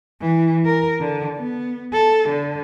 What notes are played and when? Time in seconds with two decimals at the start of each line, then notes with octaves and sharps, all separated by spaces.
0.21 E3
0.66 A#4
1.00 D3
1.36 B3
1.93 A4
2.28 D3